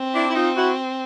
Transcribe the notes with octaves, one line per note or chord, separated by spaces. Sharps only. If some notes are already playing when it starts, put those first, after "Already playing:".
Already playing: C4
D4 E4
E4
D#4 F4
E4 F#4